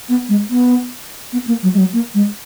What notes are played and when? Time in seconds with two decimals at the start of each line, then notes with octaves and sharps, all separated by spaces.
0.09 B3
0.29 G#3
0.50 B3
1.33 B3
1.47 A#3
1.63 F#3
1.74 G#3
1.78 F#3
1.93 A#3
2.14 G#3